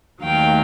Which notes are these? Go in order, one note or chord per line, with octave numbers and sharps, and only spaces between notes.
D#2 D#3 F#3 A3 F5 G5